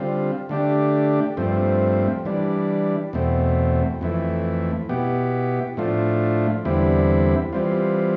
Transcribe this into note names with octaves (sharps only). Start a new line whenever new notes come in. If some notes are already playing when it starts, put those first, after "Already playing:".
Already playing: D3 G3 C4 F4
D3 A3 D4 G4
G2 F3 A3 C4
E3 G3 D4
E2 B2 A3 C4
F2 E3 A3
B2 B3 E4 G4
A2 F3 A3 D4 F4
E2 D3 G3 C4 E4
E3 G3 C4 F4